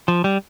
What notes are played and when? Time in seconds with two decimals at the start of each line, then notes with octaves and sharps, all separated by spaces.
0.08 F3
0.24 G3